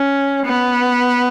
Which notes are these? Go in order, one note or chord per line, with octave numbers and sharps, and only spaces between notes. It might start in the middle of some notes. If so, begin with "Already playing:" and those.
Already playing: C#4
B3